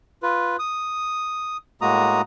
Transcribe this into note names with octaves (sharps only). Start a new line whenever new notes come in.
F4 B4
D#6
A2 G#3 A#3 F#4 A#5 D#6